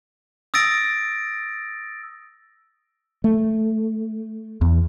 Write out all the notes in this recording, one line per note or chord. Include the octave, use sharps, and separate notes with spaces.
D#6 E6 A6 A#6 D7
A3
E2